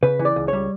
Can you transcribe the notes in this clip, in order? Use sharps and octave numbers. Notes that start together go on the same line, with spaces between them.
C#3 B4
E3
D5
C#2
G3 C#5